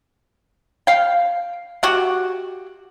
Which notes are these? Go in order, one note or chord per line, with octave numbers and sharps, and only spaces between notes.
F5 G5
F#4 G4 F#5